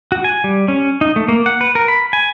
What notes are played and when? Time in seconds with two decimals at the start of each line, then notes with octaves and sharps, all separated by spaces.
0.12 F#4
0.24 G#5
0.44 G3
0.68 C#4
1.01 D#4
1.16 A3
1.28 A#3
1.46 F#5
1.61 B4
1.75 A#4
1.88 B5
2.13 G#5